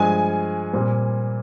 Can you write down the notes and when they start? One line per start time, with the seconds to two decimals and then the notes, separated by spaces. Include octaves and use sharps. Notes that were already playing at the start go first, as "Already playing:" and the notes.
Already playing: G2 F3 G#3 G#5
0.73 A#2 G3 C4